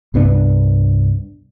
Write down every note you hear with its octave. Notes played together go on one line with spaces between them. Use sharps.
C2 G2 B3 D4